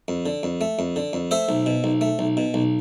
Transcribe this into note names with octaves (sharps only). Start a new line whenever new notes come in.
F2
D3
F2
A3
F2
D3
F2
A3 C5 E5
B1
B2
B1
A3
B1
B2
B1